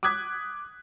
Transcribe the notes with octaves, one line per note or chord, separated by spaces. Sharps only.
D6 D#6 F#6 G#6 B6